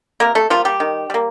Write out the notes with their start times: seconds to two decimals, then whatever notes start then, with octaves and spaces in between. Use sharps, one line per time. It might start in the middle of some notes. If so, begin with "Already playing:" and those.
0.20 C3 A#3 A#4
0.35 A3 A4
0.50 F3 G3 A#3 F4
0.65 G3 G4
0.80 D#3
1.10 G3 A#3